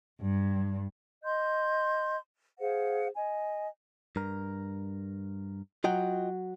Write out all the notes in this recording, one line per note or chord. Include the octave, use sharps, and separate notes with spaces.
G2
D#5 C6 G6
G#4 C5 F5 F#5
D#5 G#5
G2 A#4
F#3 F4 D#5 G5